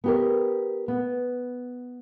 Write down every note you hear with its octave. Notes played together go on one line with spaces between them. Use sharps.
B3 G4 A#4
B3